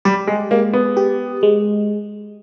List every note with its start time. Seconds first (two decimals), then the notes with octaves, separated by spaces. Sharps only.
0.05 G3 G4
0.27 G#3
0.51 G#3 A#3
0.73 B3
0.97 G4
1.43 G#3